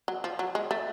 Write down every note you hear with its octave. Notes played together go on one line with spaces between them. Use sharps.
F#3
F3
F#3
G#3
A3